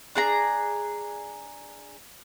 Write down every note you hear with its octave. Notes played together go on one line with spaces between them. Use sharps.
D4 G#4 A#5